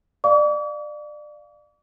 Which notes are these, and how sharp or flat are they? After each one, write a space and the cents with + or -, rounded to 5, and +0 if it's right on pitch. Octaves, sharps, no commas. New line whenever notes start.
D5 +25 F5 +0 D6 -45